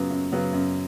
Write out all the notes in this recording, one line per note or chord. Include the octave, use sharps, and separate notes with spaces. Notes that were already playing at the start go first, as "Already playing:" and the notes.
Already playing: F#2 C#3 F#3 B3
F#2
C#3 F#3 B3
F#2